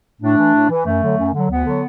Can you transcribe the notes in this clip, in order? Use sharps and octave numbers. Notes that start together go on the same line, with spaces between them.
A2 A3 D4
E3
A2
E3
F#2 A3
D3 F#3
F#2
D3 F#3
D2 B3
D3 F#3